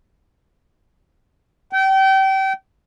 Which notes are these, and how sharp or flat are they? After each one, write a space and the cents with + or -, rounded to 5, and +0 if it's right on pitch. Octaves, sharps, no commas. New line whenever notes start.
G5 -30